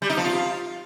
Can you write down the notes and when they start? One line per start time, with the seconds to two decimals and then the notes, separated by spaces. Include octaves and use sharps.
0.02 G3
0.10 D#4
0.17 F3
0.25 F4